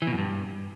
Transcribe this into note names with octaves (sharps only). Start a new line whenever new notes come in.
E3
B2
F#2
G2